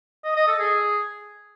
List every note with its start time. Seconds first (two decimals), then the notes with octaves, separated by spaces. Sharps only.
0.25 D#5
0.36 D#5
0.48 A4
0.60 G#4